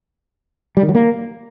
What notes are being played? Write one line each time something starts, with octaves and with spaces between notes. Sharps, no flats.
G3
D#3
F#3
A#3